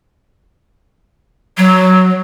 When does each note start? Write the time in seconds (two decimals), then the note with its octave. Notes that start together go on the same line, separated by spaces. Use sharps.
1.58 F#3